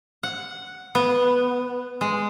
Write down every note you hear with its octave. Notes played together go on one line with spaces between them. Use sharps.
F#5
B3
G#3